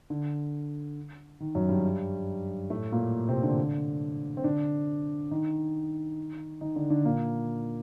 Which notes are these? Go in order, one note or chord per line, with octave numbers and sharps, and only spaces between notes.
D3
D#3
F#2 F#3
G2 G3
A2 A3
A#2 A#3
C3 C4
D3 D4
C4
D3 D4
D#3 D#4
D#3 D#4
D3 D4
D3 D4
A#2 A#3